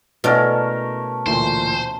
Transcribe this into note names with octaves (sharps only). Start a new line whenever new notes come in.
B2 A3 C#4 E4 A#4 D5
D2 A#2 E3 C5